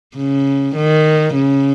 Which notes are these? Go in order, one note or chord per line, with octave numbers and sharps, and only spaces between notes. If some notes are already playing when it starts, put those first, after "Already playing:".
C#3
D#3
C#3